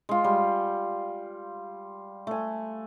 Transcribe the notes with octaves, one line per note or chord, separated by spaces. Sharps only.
G#3 F4
G3
A3 G#5